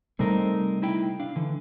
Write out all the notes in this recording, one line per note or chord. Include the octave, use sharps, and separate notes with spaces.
C3 G3 A3 C4 D#4 A#4
D#4 E4 G5
D4 F5
D3 E3